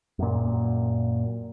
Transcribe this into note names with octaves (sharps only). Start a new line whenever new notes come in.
F#2 A#2